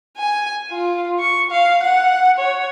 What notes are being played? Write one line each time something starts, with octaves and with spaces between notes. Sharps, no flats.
G#5
F4
C#6
F5
F#5
C#5